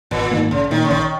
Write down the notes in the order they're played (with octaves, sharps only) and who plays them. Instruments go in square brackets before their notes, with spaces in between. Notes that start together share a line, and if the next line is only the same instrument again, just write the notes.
[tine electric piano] G#1 [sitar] A#2
[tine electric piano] G#2 D#3 A#3
[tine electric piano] A#1 [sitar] C#3
[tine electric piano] A#2 A#3 D#4 [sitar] D#3
[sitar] C#3
[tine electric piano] A#1 [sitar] D#3